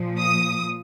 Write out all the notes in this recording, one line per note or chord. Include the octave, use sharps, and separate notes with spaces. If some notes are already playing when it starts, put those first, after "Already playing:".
Already playing: A#2 F3
D#6